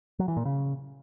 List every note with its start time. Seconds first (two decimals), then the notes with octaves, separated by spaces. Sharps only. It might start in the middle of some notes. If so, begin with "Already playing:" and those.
0.19 F#3
0.28 E3
0.37 A#2
0.45 C#3